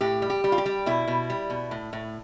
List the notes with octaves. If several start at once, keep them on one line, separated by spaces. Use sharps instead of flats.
A2 G4
G3
G4
G3
F4
G4
G3
B2 E4
B2
G3
B2
A2
A2